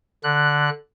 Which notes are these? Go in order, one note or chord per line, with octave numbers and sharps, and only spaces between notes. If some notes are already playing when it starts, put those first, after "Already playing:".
D3 F#6